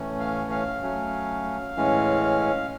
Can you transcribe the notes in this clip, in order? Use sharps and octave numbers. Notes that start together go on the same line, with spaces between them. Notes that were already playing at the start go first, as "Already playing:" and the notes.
Already playing: A2 E3 A3 C#4
F5
F5
F#3 A3 C#4
A2 E3 G#3 C#4